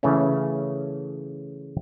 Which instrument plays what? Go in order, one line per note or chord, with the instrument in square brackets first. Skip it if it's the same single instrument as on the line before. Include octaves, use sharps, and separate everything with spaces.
[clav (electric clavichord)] C#3 E3 A3 C#4